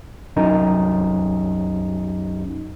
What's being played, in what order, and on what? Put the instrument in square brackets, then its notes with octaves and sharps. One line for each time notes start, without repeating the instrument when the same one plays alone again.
[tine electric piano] C2 F#2 D#4